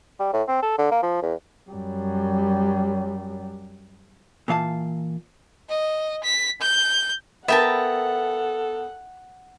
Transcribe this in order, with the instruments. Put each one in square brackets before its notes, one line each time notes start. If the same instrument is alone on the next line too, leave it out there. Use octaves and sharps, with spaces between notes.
[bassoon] G3
A2
C4
A4
D3
A#3
F3
E2
[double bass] F#2 G3
[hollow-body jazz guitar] A#2 E3 F5 A5
[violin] D#5
B6
G6
[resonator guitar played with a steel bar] B3 A#4 [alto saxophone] A4 [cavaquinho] E5 G5 A5 [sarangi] F#5